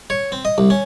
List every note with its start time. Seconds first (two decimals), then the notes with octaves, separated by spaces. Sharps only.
0.10 C#5
0.32 C4
0.45 D#5
0.58 C2
0.70 C#4